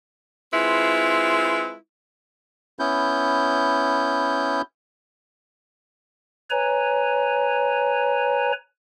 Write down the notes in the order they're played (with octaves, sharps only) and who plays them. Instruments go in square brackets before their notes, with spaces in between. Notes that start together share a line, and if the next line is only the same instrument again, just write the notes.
[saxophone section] G#3 C4 E4 F4 B4
[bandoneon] B3 C#4 E4 G6
[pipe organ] B4 C#5 G#5 A#5